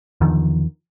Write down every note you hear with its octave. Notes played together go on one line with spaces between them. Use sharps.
E2 D3 D#3 F3